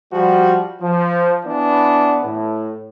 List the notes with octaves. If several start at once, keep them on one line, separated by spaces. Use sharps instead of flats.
F3 G3 F#4
F3
E3 B3 D4
A2